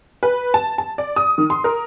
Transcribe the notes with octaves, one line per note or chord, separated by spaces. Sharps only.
B4
A5
A5
D5
D#6
D#3
C6
A#4